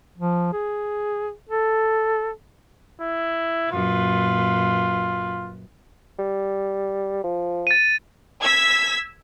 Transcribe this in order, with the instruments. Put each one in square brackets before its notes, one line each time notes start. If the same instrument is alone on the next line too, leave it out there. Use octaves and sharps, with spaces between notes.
[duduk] F3
G#4
A4
[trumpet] E4
[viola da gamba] F#2 A#2 B4 [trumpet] F4
[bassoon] G3
F3
[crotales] A6 D#7
[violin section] E6 G#6 B6